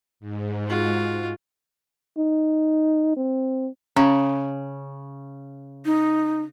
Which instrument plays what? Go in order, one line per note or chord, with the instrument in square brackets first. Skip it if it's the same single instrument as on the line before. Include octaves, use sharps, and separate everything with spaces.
[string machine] G#2
[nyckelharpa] F4 F#4
[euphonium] D#4
C4
[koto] C#3 [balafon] C#4
[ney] D#4